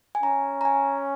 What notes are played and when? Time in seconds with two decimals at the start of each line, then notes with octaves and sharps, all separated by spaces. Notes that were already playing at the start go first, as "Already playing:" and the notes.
0.15 G#5
0.23 C#4 A#5
0.61 A#5
0.65 G#5